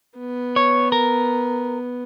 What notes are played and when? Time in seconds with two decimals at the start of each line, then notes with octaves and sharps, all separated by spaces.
0.18 B3
0.56 C#5
0.92 A#4